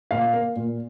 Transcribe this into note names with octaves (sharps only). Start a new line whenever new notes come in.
A#2 F5
A#3
A#2